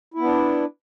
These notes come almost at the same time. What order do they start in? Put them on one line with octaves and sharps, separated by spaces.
E4 B3 D4